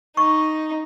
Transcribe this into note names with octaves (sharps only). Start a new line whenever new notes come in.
D#4 C#6